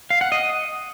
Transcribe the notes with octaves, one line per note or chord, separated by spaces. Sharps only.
F5
F#5
D#5